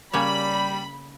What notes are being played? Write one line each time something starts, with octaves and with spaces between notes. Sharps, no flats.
C#3 G3 A#3 C#5 B5